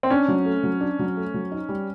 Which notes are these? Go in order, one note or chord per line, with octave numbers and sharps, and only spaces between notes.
C4
C#4 D4
F#3
A3
F#3
D4
F#3
A3
F#3
D#4
G3